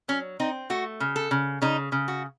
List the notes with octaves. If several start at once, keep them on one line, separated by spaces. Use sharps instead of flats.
F#3 C#4
C4 D#4
A3 F#4
C#3
A4
C#3
C#3 D#4
C#3
F#4